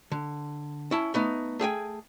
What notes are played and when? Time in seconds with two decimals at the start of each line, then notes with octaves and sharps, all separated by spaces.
0.12 D3
0.91 C#4 E4 A5
1.14 A3 B3 D#4
1.59 A3 G#4 G5 G#5